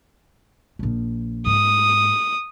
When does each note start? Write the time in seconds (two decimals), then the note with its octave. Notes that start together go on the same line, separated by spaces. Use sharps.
0.79 A#1 F3
1.46 G#2 D#6